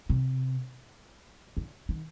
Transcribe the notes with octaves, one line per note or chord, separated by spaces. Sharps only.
C3
D3
D#3